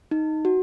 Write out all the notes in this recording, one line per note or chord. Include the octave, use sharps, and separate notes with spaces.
D#4
F#4